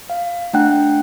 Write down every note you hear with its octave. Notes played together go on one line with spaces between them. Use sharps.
F5
A3 D4 F#5 G5 F#6